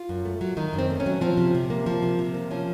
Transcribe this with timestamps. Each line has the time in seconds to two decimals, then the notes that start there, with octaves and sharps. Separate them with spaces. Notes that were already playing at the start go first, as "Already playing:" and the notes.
Already playing: F4
0.09 F#2
0.25 A3
0.41 F#3
0.57 D#3 D#4
0.73 F#2
0.78 C4
0.90 A3
1.00 C#4
1.06 F#3
1.21 F3 C4
1.37 C3
1.55 C3
1.70 A#3
1.86 F3
2.03 C3
2.19 C3
2.34 A#3
2.51 F3 C#4